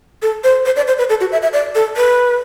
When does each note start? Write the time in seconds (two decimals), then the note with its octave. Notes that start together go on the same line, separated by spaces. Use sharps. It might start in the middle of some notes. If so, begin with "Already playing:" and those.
0.22 A4
0.44 C5
0.66 C5
0.76 D5
0.88 C5
0.98 B4
1.09 A4
1.21 F#4
1.32 E5
1.42 E5
1.53 D5
1.75 A4
1.97 B4